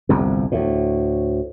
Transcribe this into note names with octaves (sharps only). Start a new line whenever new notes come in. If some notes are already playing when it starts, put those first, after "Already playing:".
G1 C2 F2
D2 A2